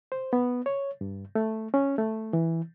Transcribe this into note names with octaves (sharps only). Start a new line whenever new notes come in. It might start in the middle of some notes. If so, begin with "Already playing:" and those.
C5
B3
C#5
G2
A3
C#4
A3
E3